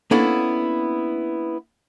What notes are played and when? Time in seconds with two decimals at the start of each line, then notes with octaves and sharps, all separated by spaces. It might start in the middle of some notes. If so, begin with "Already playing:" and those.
0.11 A#3 B3 C#4 D4 E4 A4